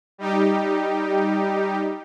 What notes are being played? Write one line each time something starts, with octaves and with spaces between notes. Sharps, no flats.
G3 D#4 G4